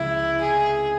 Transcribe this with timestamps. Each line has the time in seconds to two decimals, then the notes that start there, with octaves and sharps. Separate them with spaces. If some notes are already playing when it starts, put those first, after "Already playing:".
Already playing: C#2 C3 F3 G#3 E4
0.41 G#4